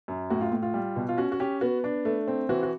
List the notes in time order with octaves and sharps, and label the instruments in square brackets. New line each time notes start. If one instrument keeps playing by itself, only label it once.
[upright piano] F#2
A2 F#4
F4
A2
F4
G3
B2
F4
C#4 F#4
F#4
C#4 G4
B3 F#4
D4
A3
C4
E3 F#4
F#4